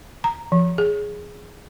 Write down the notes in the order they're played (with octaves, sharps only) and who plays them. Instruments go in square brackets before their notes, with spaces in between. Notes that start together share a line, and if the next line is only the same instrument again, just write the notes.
[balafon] A#5
F3
G#4